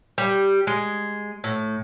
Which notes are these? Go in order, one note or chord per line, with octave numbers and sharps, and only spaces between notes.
G3
G#3
A2